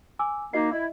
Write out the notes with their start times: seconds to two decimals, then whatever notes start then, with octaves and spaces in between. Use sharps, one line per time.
0.19 G#5 D6 E6
0.53 A#3 D#4 F#4 D#5 C7
0.71 E4 D#5 E5